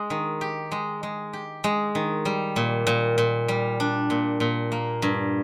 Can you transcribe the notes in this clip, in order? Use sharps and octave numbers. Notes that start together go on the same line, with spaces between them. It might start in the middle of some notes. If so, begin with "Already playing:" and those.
Already playing: G#3
D#3
G4
G#3
G#3
G4
G#3
D#3
G3
A#2
A#2
A#2
G3
D4
A#2
A#2
A#3
G2